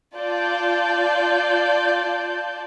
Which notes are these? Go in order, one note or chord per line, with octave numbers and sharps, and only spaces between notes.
F4 D5 A5 G6